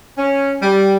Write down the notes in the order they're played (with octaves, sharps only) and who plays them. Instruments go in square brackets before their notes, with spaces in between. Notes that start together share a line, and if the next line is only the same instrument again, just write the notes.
[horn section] C#4
G3